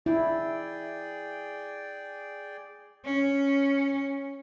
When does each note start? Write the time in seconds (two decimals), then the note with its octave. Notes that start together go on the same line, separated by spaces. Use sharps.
0.06 E4 G#4 D5 G5
3.05 C#4